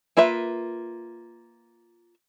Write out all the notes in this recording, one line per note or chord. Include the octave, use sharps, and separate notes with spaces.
A#3 F4 B4 E5